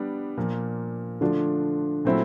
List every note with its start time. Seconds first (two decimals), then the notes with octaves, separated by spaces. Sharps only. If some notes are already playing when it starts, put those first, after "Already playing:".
Already playing: G3 B3 D4
0.37 A#2 F3 A#3
1.21 D3 F3 A3 D4 F4
2.05 A#2 F#3 A3 C4 E4